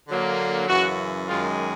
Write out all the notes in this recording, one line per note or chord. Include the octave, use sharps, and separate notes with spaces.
D3 F#3 A#3
F#2 C#3 E3 F#4
F#2 D#3 G#3 F4